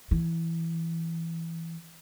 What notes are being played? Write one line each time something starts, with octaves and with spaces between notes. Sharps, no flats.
E3